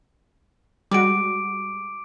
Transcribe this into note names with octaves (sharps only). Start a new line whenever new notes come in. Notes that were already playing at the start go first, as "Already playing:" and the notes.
G3 G#3 F#4 D6 D7